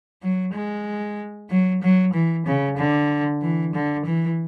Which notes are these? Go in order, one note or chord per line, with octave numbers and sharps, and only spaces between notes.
F#3
G#3
F#3
F#3
E3
C#3
D3
E3
D3
E3